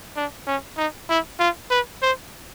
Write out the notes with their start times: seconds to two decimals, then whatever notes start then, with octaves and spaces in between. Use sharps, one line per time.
0.16 D4
0.47 C#4
0.78 D#4
1.10 E4
1.40 F4
1.71 B4
2.02 C5